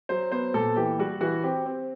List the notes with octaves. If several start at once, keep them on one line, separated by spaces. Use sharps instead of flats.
F#3 C5
B3 C5
A#2 A4
E3 G4
G3 F#4
E3 F#4
C4 G4
C4